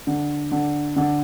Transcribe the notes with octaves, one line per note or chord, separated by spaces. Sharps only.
D3
D3
D3